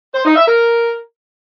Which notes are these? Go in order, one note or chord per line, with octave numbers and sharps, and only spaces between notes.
C5
D#4
E5
A#4